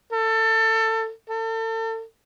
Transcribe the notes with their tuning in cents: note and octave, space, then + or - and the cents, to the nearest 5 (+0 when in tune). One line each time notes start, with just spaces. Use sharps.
A4 +25
A4 +35